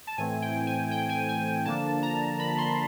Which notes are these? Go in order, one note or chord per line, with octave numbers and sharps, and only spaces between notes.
A5
A2 E3 A3 C4 G#5
G5
G#5
G5
G#5
G#5
G#5
D3 F3 A#3 D4 A5
A#5
B5
C6